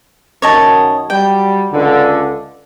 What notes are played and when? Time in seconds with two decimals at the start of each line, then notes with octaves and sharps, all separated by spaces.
0.42 F#2 D#3 C#5 D#5 A5
1.10 F#3 G3 G5
1.71 C#2 D3